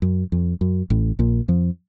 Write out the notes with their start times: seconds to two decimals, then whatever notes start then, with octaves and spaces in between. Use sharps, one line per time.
0.02 F#2
0.32 F2
0.61 F#2
0.90 A1 A2
1.19 A#1 A#2
1.48 F2 F3